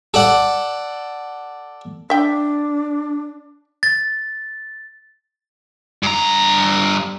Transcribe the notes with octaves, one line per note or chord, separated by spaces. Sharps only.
A4 D5 F#5
D4 E5 G5
A6
G2 A#5